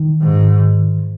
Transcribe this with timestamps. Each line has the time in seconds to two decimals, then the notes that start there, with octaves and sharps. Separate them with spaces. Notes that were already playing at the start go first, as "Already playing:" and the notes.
Already playing: D#3
0.22 G#2